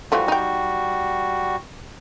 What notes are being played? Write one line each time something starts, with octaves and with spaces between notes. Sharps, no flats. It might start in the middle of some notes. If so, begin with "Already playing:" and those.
E3 F3 G3 A3 F#4
D#4 G5